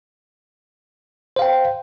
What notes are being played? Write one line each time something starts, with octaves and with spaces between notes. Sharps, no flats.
C5 F5 G5